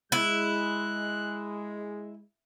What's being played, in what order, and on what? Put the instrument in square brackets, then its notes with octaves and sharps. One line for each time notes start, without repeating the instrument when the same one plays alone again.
[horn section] G#3 [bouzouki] E4 [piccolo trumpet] F#6